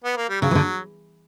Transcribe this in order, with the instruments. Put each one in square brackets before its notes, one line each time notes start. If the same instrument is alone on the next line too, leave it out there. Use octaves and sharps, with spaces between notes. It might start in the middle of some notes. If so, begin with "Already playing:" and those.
[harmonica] B3
A#3
G3
[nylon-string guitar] C#3 [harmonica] F#3
[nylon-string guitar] E3
D3